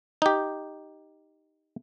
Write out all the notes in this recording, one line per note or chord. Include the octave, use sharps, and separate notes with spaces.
D#4 G4